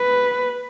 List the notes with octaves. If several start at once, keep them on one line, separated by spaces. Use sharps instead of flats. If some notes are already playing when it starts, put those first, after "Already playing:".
Already playing: B4